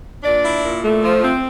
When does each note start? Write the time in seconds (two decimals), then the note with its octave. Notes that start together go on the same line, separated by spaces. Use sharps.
0.23 A#2 D4 D5
0.43 E4
0.63 A#2
0.83 A3
1.02 F3
1.23 C4